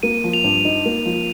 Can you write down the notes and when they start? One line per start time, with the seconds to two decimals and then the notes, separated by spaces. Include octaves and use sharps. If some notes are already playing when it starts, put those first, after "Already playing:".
0.03 A#3 D#7
0.24 F3
0.33 F7
0.44 G2
0.65 D#4
0.85 A#3
1.05 F3